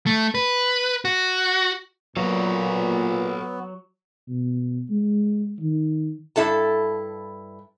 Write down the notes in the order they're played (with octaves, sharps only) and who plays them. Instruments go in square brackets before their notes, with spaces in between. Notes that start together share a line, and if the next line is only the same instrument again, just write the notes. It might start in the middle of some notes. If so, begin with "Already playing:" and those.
[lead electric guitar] A3
B4
F#4
[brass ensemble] A#2 [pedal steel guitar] F#3 [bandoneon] B3 [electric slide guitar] A4 B4 F5
[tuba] B2
G#3
D#3
[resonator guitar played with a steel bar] G2 E4 A4 A5